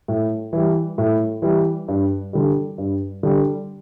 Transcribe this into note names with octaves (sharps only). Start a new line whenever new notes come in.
A2
E3 G3
A2
E3 G3
G2
D3 G3
G2
D3 G3